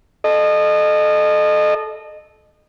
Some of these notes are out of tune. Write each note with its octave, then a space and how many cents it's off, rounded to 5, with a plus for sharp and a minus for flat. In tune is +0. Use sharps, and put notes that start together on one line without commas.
A4 -20 D#5 -30